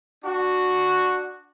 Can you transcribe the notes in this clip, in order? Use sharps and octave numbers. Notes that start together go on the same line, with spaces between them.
D4 F#4